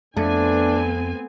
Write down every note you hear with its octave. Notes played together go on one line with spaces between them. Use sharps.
F2 A3 B3 C4 D4 G#5